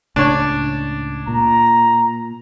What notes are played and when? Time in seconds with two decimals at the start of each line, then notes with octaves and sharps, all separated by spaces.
0.16 C#2 A2 C#3 D4 C#5
1.27 A#2 A#5